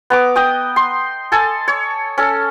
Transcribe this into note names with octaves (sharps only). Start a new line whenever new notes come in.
B3 A#5 D6
D#5 G5 D#6
C6
A4 G#5 A5
C#5
C#4 A4